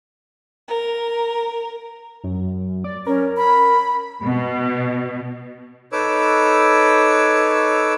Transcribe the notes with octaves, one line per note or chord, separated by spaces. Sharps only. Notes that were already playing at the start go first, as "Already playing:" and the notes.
A#4
F#2
D5
C#4 A#4
B5
B2
D#4 A4 B4 C#5 D6 E6